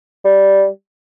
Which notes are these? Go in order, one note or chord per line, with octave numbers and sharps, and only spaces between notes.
G3